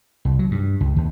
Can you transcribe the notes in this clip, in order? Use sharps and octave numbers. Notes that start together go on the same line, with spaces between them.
C2
F#3
G2
C#2
D#2